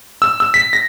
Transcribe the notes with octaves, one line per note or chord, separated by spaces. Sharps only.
E6
E6
B6
A#6